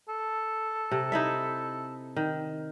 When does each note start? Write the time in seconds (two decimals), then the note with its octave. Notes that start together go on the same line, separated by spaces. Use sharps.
0.08 A4
0.91 C3
1.12 D#4 E4 E5
2.16 D#3